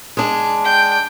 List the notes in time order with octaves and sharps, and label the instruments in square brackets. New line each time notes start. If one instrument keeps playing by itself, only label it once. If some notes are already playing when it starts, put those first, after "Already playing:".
[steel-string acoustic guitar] G#3 D4
[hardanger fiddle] G5